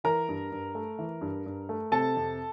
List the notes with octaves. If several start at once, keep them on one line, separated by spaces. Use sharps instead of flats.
E3 A#4 A#5
G2
G2
A3
E3
G2
G2
A3
C3 A4 A5
F2